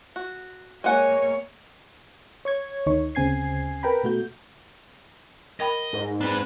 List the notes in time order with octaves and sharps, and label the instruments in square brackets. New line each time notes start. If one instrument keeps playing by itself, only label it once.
[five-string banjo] F#4
[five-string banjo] G#3 F#5 G#5 [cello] A#3 C#5
[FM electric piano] C#5 C#6 G#6
D2 D#3 D#4 C#5 C#6
D2 C#3 C4 G#5 G#6 C7
A#4 B4 G5 A#5 B5
B2 A3 F#4 G6
[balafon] A#4 G5 B5 [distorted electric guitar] D#5
[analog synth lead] G#2
[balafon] C4 [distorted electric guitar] D4 B4